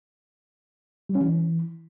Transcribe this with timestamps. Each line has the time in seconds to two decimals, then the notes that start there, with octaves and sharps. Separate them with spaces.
1.09 G3
1.15 C#4
1.21 E3